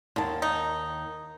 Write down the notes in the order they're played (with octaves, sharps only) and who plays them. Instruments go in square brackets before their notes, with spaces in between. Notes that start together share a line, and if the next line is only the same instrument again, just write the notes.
[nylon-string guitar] D#2 D#3 A5 [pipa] D3
[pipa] D#4